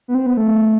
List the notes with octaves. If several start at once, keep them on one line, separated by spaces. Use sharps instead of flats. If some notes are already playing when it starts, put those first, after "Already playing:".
B3
C4
B3
A3